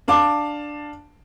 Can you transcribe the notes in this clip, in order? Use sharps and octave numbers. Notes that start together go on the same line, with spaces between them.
D4 F5 A5 D6